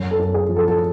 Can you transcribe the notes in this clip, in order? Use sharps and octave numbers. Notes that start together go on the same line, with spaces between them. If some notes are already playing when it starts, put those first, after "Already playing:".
Already playing: F#2
A4
F#2
G#4
F3
A4
A4